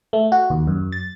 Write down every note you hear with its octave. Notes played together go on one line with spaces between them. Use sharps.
A3
F#4
D#2
F#2
A6